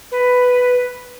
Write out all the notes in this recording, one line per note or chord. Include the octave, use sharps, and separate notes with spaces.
B4